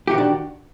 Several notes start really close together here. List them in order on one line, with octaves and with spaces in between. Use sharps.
G4 F#4 D#3 D4